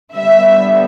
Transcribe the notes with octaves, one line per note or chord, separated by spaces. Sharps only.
D3 G3 B3 E5